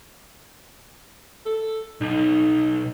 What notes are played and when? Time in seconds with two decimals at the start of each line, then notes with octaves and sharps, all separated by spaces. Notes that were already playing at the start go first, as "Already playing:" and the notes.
1.45 A4
2.01 B1 D#4